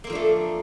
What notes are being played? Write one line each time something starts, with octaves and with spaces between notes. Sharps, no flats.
F3 A3 A#3 C4 D4